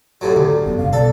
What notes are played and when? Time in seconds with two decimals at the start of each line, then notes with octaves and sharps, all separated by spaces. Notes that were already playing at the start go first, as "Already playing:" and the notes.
0.21 F#2 A2 F#3 G4
0.36 D2 D3
0.65 G1 F#2 B3
0.77 G2 C#3 F5
0.93 B1 B2 A4 D5